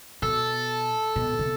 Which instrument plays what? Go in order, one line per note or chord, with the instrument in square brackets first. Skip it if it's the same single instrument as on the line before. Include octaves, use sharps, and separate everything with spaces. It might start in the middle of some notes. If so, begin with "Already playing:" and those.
[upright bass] B2 [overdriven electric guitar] A4
[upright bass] B2
C3